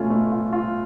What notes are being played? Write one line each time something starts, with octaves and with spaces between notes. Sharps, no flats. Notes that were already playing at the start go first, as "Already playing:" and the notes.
Already playing: B2 A3 C#4 F4
A3
F4
F4